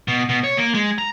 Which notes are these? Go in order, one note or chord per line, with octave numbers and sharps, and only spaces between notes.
B2
B2
C#5
A#3
G#3
A#5